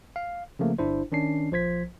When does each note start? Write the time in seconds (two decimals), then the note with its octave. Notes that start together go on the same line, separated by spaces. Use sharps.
0.16 F5
0.59 C#3 F3 A3 A#3
0.79 G1 D4 E4 C5
1.12 D#3 C#4 D4 C7
1.51 A#1 F3 C5 G#6 B6